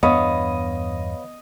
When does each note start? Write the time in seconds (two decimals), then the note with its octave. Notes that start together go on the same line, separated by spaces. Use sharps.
0.03 E2 G2 B3 D4 C#5 D#5 F5 B5